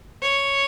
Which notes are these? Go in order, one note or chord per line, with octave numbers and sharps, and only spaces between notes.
C#5